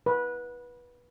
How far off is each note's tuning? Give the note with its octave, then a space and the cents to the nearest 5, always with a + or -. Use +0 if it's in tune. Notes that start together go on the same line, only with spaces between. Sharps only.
B4 -20